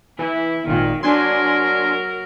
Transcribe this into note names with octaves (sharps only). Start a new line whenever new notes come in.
E3 E4
G#1 A#2 D#3
F#3 D4 A#4 G#5 C6